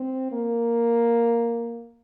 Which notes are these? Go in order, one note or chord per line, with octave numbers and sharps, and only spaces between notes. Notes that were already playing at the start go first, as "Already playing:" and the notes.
Already playing: C4
A#3